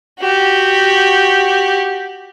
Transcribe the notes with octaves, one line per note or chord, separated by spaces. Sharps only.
F#4 G4